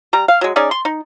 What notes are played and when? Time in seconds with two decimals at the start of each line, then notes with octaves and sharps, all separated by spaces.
0.13 G3 A#5
0.28 F5
0.41 F#3 G#3
0.56 C#4 D#4 G#4 D5
0.71 C6
0.85 D#4